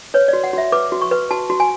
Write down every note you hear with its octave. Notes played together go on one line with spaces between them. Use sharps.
B4 C#5
F#4 D5
F#5
F#4 E5
B4 D6
F#4
C#6
B4
F#4 A5
F#4
G#5